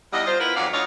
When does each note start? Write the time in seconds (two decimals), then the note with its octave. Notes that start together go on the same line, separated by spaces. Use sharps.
0.12 E2 G3 D#5
0.26 F4 C5
0.40 B3 E4 F4 A#4 B4
0.56 F2 G#2 F#3 D5 F5 F#5
0.73 D2 F4 F#4 C#5 D#5 F5